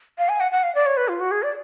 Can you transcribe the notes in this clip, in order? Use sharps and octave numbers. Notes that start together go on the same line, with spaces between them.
F5
G#5
F#5
F#5
F5
D5
C#5
B4
F4
F#4
G#4
D5